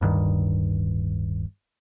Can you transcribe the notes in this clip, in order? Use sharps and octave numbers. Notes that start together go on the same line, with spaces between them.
D1 G2 D#3